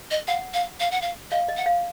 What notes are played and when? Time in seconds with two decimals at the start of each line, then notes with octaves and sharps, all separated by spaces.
0.11 D#5
0.28 F5 F#5
0.54 F5
0.80 F5
0.91 F#5
1.02 F5
1.31 D#5 F5
1.48 D#5
1.57 F#5
1.66 F5